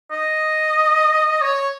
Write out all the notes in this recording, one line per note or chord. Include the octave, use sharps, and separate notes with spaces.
D#5
C#5